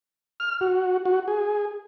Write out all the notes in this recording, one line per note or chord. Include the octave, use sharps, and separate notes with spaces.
F6
F#4
F#4
G#4